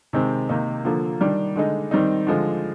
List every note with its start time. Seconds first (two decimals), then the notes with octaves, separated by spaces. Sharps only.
0.13 C3 D#3 G#3 C4
0.49 C3 D#3 A#3 D#4
0.85 D3 F3 A#3
1.20 D#3 G3 D4
1.56 D3 G#3 D#4
1.91 D#3 G3 C4 D#4
2.27 D3 F3 G#3